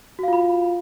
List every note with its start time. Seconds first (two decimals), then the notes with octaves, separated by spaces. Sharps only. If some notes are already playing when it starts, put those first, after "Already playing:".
0.19 F#4
0.23 F5
0.28 F4
0.33 B5